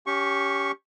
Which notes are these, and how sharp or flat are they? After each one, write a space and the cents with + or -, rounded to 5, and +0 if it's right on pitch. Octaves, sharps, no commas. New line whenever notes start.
C#4 +25 G4 +0 C#6 -10